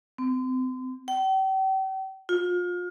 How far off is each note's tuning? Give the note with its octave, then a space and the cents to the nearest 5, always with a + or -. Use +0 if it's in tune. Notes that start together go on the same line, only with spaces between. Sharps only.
C4 -35
G5 -40
F4 +30